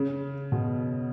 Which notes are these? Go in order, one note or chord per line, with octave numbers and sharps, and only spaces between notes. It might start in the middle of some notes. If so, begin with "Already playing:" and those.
Already playing: C#3
B2